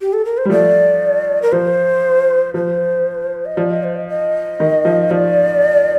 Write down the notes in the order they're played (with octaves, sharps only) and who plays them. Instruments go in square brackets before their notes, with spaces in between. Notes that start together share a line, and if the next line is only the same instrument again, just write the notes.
[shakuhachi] G4
A4
A#4
C5
[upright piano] G3
[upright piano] F3 A3 [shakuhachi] D5
[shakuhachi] A#4
[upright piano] F3 [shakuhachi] C5
[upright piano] F3 [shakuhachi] C5
[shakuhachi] D#5
[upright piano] F3 [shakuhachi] D5
[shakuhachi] D#5
C5
D#5
D#5
[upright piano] D#3
F3
[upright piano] F3 [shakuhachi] D5